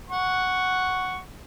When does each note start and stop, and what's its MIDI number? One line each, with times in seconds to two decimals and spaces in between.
0.11 1.19 78
0.11 1.19 85